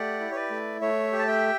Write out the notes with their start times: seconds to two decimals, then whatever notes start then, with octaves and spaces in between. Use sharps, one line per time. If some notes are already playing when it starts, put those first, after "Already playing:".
Already playing: A3 G4 D5 F#5
0.20 E4
0.31 C#5
0.35 B4 D5
0.51 A3
0.81 A3 C#5 E5
1.12 G4
1.19 A5
1.28 E5 G5